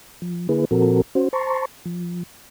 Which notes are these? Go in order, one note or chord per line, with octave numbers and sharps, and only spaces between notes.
F3
D3 A#3 E4 G#4 B4
A#2 F3 C4 F#4 A4 A#4
C#4 F#4 C5
C5 A5 A#5 C6 C#6
F3